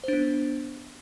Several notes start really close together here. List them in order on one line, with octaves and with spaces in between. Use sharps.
C5 D4 B3